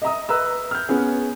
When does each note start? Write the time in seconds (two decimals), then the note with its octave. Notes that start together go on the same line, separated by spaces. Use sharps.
0.02 D#5 E5 A#5 D#6
0.29 B4 E5 A#5 E6
0.71 F6 G6
0.89 B3 C#4 G#4